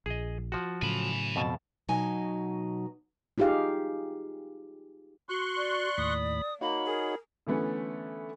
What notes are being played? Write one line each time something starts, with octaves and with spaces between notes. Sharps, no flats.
A#1 G#4 D#5
F3 F#4
A2 C#3 F#3 G#5 B5
F2 B2 A5
B2 F#3 D#4 G#5
D#4 F4 G4 G#4 F5
F#4 C6 C#6 F#6
D5
D#2 A2 B5 D#6
A#3 D#4 F#4 C#5 B5
G#4 A#4
D3 E3 A3 B3 C#4